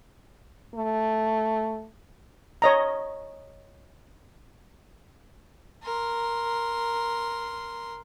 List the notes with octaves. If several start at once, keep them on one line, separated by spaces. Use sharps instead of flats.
A3
C#5 D#5 A#5
A#4 C6